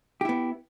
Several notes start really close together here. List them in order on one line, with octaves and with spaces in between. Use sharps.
G4 E4 B3